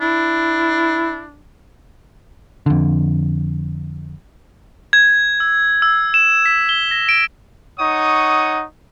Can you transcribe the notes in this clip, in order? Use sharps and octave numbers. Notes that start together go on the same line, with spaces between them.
D4 E4
F2 D3
G#6
E6
E6
E7
B6
G7
A#6
D7
D#4 C#5 F#5 C#6 D#6